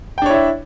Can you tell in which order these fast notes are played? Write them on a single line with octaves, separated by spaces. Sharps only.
G5 D4 C#5 E4 E5